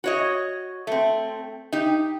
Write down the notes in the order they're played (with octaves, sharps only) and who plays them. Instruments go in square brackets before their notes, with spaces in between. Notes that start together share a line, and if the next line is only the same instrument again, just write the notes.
[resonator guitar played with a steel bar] F#4 C#5 D#5
A3 C4
D#4 G4